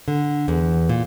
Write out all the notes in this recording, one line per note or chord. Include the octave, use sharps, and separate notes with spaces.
D3
E2
A#2